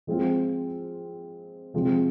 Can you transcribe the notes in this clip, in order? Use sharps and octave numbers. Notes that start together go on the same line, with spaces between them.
F3 G#3 C4 F4
C3 F3 G#3 C4